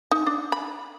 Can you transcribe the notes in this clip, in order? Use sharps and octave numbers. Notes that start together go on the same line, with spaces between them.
D#4
D4
B5